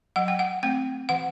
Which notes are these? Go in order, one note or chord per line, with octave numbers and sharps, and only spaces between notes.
F#3 F#5
G5
F#5
A3 C4 G5
E3 F#5